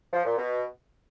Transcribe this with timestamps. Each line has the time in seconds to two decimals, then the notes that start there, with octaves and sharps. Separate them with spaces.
0.13 F3
0.25 A#2
0.37 B2